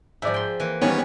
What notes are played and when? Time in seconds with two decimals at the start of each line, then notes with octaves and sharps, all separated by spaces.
0.22 G#2 F3 D5 E5
0.34 G5 C6
0.60 E3 A#3
0.82 D#3 E3 G3 B3 C#4 C#5